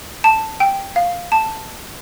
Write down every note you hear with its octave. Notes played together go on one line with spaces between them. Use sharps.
A5
G5
F5
A5